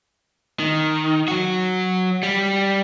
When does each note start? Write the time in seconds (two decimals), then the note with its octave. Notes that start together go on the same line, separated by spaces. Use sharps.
0.60 D#3
1.28 F#3 F#4
2.23 G3